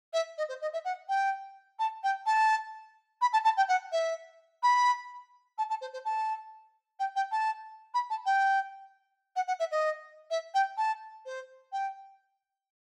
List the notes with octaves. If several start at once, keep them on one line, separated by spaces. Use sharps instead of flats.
E5
D#5
C5
D#5
E5
F#5
G5
A5
G5
A5
B5
A5
A5
G5
F#5
E5
B5
A5
A5
C5
C5
A5
G5
G5
A5
B5
A5
G5
F#5
F#5
E5
D#5
E5
G5
A5
C5
G5